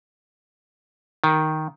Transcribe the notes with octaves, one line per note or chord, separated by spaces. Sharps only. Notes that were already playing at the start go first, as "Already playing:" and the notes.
D#3